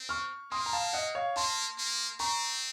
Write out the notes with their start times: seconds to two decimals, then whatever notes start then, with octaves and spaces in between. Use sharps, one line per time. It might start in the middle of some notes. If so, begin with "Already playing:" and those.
Already playing: C4
0.09 C#6 F6
0.52 A#3 C6 D#6
0.66 A#5
0.73 F5 A5
0.93 D#5 F#5
1.15 C#5 F5
1.36 A#3 A5 C6
1.78 A#3
2.20 C4 A#5 C#6